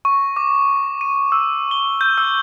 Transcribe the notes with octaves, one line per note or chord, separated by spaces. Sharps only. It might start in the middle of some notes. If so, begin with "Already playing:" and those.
C#6
D6
D#7
E6
G7
G6
E6